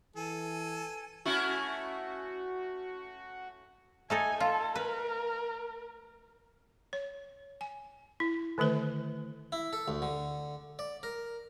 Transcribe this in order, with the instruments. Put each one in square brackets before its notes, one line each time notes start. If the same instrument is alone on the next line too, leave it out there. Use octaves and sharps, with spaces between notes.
[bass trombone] E3 [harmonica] A4 [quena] G#5
[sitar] A3 C#4 E4 [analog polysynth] F#4
[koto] A3 D#4 A4 [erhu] G#5
[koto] F4 [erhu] A4
[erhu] A#4 [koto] B4
[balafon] C#5
G#5
E4
D3 D#3 A3 B4 C5
[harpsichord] E4
A4
D2
D3
D5
A#4